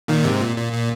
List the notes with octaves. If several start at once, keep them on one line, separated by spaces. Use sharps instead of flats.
A#2 D#3
G#2 C3
A#2
A#2
A#2